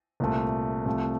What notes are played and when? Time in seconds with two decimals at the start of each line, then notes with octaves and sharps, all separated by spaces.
0.20 C2 A#2 A3
0.86 C2 C3 F3 A3